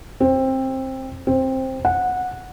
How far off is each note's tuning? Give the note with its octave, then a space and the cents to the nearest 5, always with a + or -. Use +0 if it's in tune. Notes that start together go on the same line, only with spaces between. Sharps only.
C4 +15
C4 +10
F#5 -15